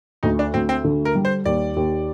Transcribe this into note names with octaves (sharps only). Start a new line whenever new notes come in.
D2 D#4
D4
D2 C4
C4
D3
A#4
G3
C5
D#2 D5
D#2